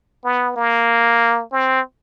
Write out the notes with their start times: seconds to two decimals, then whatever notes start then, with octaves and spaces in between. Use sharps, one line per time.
0.24 B3
0.56 A#3
1.52 C4